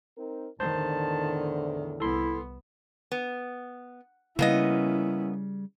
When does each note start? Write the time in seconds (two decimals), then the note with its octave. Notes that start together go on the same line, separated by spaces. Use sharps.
0.18 C4 D#4 A#4
0.60 E2 A2 D3 D#3 C5 A5 C6
2.00 C2 B3 E4 A4 C6
3.12 B3
4.39 C#3 G3 A#3 B3 C#4 E4 D#5